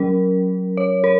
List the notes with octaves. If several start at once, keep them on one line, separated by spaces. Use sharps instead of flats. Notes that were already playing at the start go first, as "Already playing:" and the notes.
Already playing: F#3 C#4 A#4
C#5
A#4